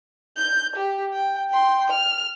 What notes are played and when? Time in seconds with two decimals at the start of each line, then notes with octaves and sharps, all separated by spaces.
0.37 G6
0.76 G4
1.13 G5
1.50 G5 C6
1.90 F6